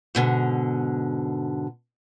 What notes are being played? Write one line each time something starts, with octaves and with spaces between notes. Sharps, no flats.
G#2 B2 D3